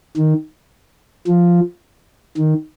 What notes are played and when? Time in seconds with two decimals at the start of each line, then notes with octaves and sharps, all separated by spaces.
0.17 D#3
1.27 F3
2.37 D#3